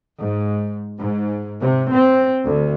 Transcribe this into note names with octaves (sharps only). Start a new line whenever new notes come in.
G#2
G#2
C3
C4
D2